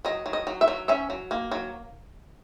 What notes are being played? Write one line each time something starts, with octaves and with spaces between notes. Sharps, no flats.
F#3 D#5
F#3
D#5
F#3
E5
F#3
C#4 E5
F#3
A#3
F#3